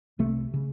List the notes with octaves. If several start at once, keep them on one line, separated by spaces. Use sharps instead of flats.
C2 C3 A3
C#3